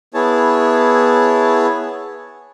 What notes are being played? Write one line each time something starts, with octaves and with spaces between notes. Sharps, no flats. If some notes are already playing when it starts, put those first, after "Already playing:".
B3 E4 G#4 C#5 A5